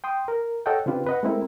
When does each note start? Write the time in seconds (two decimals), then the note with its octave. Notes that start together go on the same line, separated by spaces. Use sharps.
0.04 G5 C6 D#6
0.28 A#4
0.66 A4 C#5 D#5 F#5 G5
0.86 C#3 C4 D4 F4 G4 B4
1.06 B4 D#5 F#5
1.23 G#3 A3 C4 E4 A#4